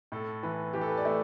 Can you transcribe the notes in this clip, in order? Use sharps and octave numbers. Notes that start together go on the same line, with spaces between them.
A2 A4
E3 B4
E3 G4
A4
B4
D5
A3 E5